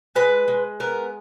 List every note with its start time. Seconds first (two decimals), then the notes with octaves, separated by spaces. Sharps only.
0.15 G#3 B4
0.48 G#3
0.80 B3 A#4